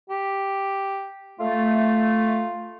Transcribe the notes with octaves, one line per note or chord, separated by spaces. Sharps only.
G4
A3 F4